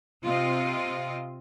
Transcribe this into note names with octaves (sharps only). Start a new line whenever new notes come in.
C3 C4 F4 D#5